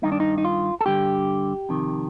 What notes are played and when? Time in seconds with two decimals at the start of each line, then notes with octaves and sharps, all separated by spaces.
0.03 G2 D#3 D#4
0.12 D4
0.20 D#4
0.38 D#4
0.45 F4
0.81 A4
0.86 G2 D3 G4
1.69 F2 C3 D#3